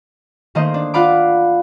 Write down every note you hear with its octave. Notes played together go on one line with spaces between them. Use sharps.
D#3 A3 A#3 C5 D#5
D4
F4 D5 F5 F#5 B5 D6